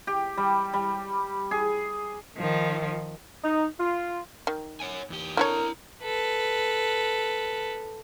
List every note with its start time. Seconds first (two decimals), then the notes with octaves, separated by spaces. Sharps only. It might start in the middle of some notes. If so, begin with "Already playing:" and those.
0.07 G4
0.37 G3
0.73 G3
1.51 G#4
2.37 D#3 F3
3.43 D#4
3.79 F4
4.47 D#3
4.80 C#5 F#5 G#5
5.10 E2 G4
5.37 D3 E4 F#4 A#4 C#5 A#5
6.03 A4 B4